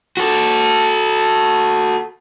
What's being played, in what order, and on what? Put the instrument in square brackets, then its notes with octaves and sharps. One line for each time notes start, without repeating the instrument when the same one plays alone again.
[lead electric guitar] F#4 A4